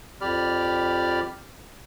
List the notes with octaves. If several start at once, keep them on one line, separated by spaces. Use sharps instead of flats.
F2 G4 D5 B5 F6